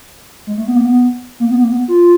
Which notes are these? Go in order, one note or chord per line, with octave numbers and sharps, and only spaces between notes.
G#3
A3
B3
A#3
B3
A#3
B3
A#3
B3
F4